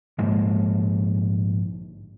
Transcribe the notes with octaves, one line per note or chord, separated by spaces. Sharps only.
A#1 G#2 G#3 A#3